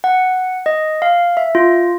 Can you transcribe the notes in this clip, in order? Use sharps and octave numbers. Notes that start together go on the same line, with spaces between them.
F#5
D#5
F5
E5
F4